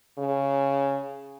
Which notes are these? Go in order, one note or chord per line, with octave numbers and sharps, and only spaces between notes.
C#3